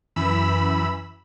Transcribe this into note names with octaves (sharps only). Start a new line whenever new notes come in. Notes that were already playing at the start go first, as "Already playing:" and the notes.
F#2 E3 B5 E6